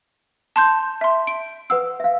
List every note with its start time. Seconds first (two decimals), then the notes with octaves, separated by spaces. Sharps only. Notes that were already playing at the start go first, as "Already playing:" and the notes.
0.56 A5 C6 G6
1.01 E5 C6
1.27 D7
1.70 B4 F#5 D#6 E6
2.00 E5 F5